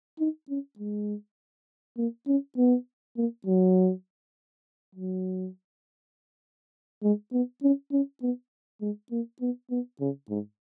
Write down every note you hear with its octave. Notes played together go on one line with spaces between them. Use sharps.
D#4
C#4
G#3
A#3
C#4
B3
A#3
F#3
F#3
G#3
B3
C#4
C#4
B3
G#3
A#3
B3
B3
C#3
G#2